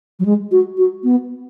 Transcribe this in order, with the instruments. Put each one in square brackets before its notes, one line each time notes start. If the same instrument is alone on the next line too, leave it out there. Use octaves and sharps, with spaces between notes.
[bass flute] F#3
G#3
F#4
F#4
B3